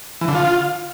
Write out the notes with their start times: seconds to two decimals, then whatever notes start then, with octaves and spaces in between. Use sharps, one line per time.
0.21 E3
0.28 D3
0.35 F4